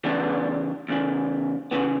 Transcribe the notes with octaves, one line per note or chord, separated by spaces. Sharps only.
E2 C#3 E3 B3 D4
E2 C#3 E3
C#3 E3 B3